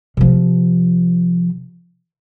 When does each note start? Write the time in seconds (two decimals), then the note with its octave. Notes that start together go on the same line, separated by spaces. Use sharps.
0.17 C3 F3